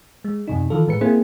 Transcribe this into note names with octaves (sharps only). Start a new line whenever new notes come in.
G#3
F#2 C3 D#4
D#3 E3 F4 A4
A2 G#3 B4 C#7
A#3 C4 E4 G#4 C5